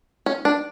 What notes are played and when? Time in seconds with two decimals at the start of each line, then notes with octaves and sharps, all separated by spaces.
0.26 C#4
0.45 D4